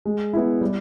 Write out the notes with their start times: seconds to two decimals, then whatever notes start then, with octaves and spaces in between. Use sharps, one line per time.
0.05 G#3
0.33 B3 E4
0.61 G3